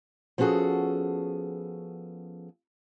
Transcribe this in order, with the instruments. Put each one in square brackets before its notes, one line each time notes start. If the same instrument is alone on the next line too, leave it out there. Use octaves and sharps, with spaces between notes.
[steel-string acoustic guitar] F3 B3 C#4 F#4 G#4 A4